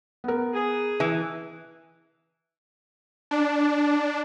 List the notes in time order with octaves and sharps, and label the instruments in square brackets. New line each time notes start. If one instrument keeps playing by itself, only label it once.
[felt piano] B3 A#4
[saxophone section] G#4
[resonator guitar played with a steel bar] E3
[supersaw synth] D4